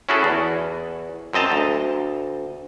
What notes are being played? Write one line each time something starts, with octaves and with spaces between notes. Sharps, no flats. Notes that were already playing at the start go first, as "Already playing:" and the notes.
C#4 E4 F#4 G#4 A4
E2
F#2 C4 D#5 A5 A#5
D2